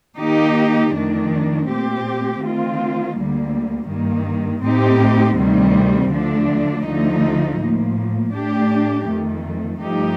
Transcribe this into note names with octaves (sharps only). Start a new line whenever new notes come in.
D#3 A#3 D#4 G4
F2 D#3 A3 D4
A#2 A3 C4 G4
D#3 A3 C4 F4
D2 D3 G3 A#3
G2 D#3 A#3
A2 A3 C4 D#4 G4
D2 C3 D#3 G3 C4
D2 D3 F3 A3 D4
D2 D3 F3 A3 D#4
A2 F3 A#3
A2 A3 D4 G4
F2 D#3 A3
G2 F3 A3 D#4 G4